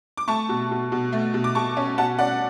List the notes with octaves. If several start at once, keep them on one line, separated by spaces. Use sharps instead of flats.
D6
A3 A5 C#6
B2
B2
B2
A3
B2
D6
B2 A5 C#6
C#4
B2 F#5 A5
C#4 D5 F#5